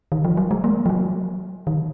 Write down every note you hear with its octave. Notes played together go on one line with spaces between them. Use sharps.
D#3
F3
F#3
G#3
A#3
F3
F#3
D#3